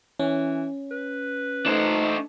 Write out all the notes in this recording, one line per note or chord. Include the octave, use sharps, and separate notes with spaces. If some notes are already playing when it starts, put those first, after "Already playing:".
E3 C#4
B4
A3 D4 D#4 C5